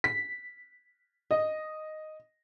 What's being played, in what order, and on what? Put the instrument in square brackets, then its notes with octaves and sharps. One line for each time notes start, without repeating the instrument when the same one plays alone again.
[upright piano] B6
D#5